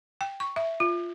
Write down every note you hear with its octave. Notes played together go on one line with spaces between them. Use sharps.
G5
C#6
E5
F4